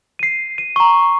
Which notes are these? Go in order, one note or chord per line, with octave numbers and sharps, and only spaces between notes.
C7 D#7
D#7
A#5 C#6